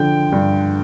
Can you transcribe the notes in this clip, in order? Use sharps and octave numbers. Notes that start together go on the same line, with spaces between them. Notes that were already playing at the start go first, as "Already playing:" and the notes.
Already playing: D3 F3 G5
G2